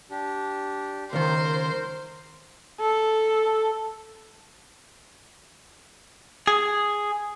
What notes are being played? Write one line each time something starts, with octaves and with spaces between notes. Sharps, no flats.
D4 G4
C#2 D#3 A#4 C5
A4
G#4